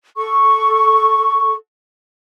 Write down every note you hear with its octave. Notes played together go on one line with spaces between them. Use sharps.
A4 C#6